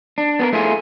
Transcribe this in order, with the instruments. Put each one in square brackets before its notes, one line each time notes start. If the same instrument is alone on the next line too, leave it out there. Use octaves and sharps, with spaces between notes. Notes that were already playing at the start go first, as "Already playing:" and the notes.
[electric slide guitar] D4
B3 G#4 A#4
A3 E4 F4 G#4